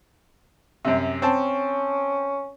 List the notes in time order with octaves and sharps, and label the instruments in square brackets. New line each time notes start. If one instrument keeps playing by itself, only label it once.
[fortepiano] F#2 C3
[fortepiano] C4 A5 [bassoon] C#4